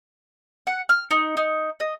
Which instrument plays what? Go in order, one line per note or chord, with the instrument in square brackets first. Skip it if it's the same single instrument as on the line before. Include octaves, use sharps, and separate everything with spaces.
[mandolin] F#5
F6
D#4
D#4
D#5